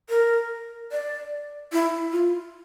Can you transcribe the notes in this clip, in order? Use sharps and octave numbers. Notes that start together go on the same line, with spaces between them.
A#4
D5
E4
F4